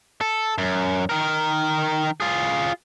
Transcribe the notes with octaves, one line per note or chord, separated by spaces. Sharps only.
A4
F#2
D#3 A#4
F4 G#4